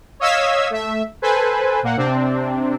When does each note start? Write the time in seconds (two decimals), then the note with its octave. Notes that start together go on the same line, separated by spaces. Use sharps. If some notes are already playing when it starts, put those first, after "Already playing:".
0.20 C#5 D#5 F5 E6 G#6 B6
0.70 A3 E5
1.22 A4 B4 C5 G#5
1.83 A#2 A#3 F#5
1.97 C3 C4 D4